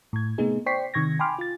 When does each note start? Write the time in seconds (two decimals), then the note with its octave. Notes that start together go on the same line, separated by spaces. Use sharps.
0.13 A2 G#6
0.38 C3 A3 B3 D#4 G#4
0.66 C5 D5 G5 C#6 B6 C7
0.94 C3 D#3 C#6 G#6 A#6
1.19 G5 G#5 B5 C6 D6 F6
1.39 F4 A6